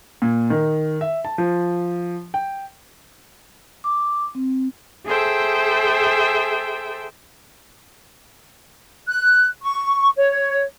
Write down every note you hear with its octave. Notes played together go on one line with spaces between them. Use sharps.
A#2
D#3
E5
A5
F3
G5
D6
C4
G#4 A4 C5 E5 G5
F#6
C#6
C#5